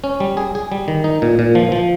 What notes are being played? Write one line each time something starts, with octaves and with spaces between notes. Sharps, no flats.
C#4
G3
G#4
G#4
G3
D#3
D#4
A#2
A#2
F3
F3